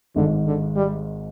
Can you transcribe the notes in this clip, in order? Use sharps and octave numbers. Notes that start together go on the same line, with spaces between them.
G#1 G#2 D3 D#3
D3
G3